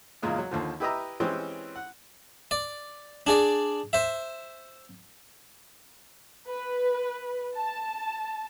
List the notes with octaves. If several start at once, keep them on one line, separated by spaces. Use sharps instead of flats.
E2 A#2 C#3 G#3 A#3
F#3
D#2 D3 F3
E4 G4 B4 D#5 E5 A#5
E3 G#3 C4 C#4 G4 C5
F#5
D5
D4 G#4 D5
C5 E5
B4
A5